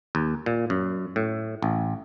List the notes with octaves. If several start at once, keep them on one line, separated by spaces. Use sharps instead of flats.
D#2
A#2
F#2
A2
A1